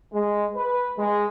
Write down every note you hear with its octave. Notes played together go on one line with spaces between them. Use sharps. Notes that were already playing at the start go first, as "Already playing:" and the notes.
G#3
B4
G#3